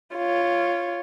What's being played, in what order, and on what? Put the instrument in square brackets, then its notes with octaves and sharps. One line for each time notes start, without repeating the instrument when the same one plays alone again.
[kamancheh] F4 C#5